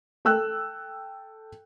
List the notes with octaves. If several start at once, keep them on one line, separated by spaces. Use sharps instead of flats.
A4 G5 E6 F#6